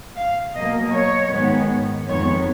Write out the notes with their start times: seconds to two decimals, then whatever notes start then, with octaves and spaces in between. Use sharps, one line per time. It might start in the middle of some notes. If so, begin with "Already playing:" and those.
0.16 F5
0.55 B2 F#3 A#3 D#5
0.93 C#5
1.31 G#2 D#3 G#3 B3
2.08 F2 D#3 G#3 B3 C#5